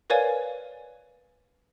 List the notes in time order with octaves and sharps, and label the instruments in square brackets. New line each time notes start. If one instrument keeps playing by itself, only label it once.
[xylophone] A#4 B4 C#5 D5 F5 G#5